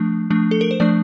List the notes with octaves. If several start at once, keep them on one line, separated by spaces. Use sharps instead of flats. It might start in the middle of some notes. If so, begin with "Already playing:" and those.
Already playing: F3 A3 D4
F3 A3 D4
A4
A#4
C5
F3 A3 D4 D5